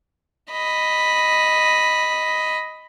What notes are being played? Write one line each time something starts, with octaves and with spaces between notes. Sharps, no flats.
D#5 B5